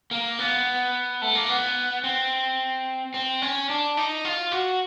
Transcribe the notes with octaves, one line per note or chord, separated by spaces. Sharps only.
A#3
B3
A3
A#3
B3
C4
C4
C#4
D4
D#4
F4
F#4